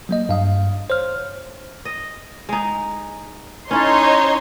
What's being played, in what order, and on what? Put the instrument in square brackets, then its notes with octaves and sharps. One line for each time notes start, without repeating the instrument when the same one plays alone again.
[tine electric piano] F#3 A#3 D#5
G2 F5 D#6
C5 C#5 F6
[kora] D#5
G#3 D#4
[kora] C#4 E4 A4 [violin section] D#4 C#5 C6